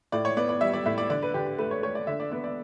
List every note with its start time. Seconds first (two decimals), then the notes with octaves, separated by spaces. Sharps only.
0.12 A2 D5
0.25 C#5
0.37 B3 D5
0.49 D5
0.61 G3 E5
0.73 D5
0.86 A2 E5
0.98 D5
1.10 D3 D5
1.22 B4
1.34 D3 G4
1.47 G4
1.59 A3 B4
1.71 C#5
1.83 A3 C#5
1.95 D5
2.07 D3 E5
2.20 D5
2.32 B3 D5
2.44 D5